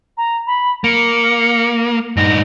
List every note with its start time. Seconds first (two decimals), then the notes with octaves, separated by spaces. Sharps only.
0.17 A#5
0.47 B5
0.84 A#3 C#7
2.17 G2 D#4 A#6